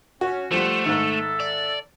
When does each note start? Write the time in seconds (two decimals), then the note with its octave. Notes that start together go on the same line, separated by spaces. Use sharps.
0.21 C#4 F#4
0.51 F3 G3 A3 C5 F#5
0.86 G#2 D#3 A4 E5
1.40 D5